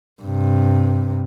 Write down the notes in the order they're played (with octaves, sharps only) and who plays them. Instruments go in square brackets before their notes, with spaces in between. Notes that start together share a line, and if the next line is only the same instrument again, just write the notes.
[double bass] G2 C3